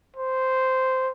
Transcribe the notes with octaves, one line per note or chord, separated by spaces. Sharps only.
C5